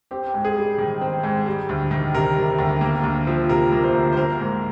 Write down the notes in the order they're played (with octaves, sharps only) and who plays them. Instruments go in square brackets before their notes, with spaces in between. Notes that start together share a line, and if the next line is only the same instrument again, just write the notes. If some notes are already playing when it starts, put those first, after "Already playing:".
[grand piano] C4 G4
G#2
G#4
G3
D#3
C4
G#2
G3
D2
D#3
C3 A#4
G3
D2
A#3
D2
F3
C3 A#4
A#3
C5
D2
C5
A#3 A#4
G#2